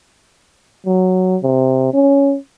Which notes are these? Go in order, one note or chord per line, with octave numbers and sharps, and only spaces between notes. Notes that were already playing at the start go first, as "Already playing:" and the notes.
F#3
C3
C#4